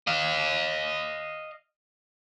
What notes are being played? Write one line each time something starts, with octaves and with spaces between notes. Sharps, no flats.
D#5 F5